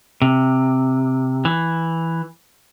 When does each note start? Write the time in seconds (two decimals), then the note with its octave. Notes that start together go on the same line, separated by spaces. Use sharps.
0.22 C3
1.45 E3